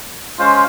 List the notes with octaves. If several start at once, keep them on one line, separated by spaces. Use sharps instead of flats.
G#3 C#4 F4 C5